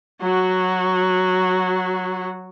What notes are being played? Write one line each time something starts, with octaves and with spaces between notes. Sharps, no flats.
F#3 F#4